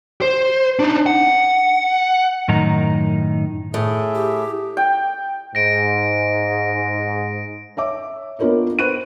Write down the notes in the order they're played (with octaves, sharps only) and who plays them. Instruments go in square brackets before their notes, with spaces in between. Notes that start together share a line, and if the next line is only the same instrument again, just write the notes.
[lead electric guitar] C5
D4 D#4
F#5
[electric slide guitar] F#2 A2 D#3 D#4 A#5
[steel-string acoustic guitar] A2 [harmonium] G#4 E5
[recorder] G4
[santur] G5
[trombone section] G#2 [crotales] A#6 D7
[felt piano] C#5 E5 D6
B3 D4 F4 A#4 C#5 D#5
B4 C5 C#6 F#6 D#7